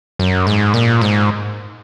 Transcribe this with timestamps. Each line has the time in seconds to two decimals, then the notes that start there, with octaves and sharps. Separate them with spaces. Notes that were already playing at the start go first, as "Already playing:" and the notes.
0.19 F#2
0.47 G#2
0.74 A#2
1.02 G#2